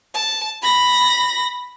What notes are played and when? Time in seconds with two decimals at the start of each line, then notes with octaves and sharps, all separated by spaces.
0.15 A5
0.62 B5 A#6